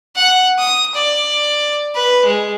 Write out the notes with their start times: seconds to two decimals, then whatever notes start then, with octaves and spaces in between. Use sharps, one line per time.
0.16 F#5
0.59 D#6
0.95 D5
1.95 B4
2.25 G#3